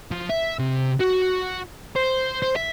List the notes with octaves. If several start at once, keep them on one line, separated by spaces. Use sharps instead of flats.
F3
E5
C3
F#4
C5
C5
E5